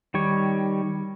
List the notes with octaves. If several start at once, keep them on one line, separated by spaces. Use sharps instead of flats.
D#3 G3 C#5